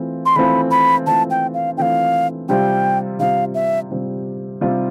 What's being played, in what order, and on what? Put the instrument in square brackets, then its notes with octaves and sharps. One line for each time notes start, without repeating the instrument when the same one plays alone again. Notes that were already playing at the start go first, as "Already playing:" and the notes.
Already playing: [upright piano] E3 A3 C4 F4
[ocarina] C6
[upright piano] E3 A3 C4 F4 [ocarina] B5
[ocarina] B5
[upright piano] E3 A3 C4 F4 [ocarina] A5
[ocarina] G5
F5
[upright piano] E3 A3 C4 F4 [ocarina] F5 G5
[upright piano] C3 G3 C4 F4 [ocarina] G5
[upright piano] C3 G3 C4 F4 [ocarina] F5
[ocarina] E5
[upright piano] C3 G3 C4 F4
C3 G3 C4 F4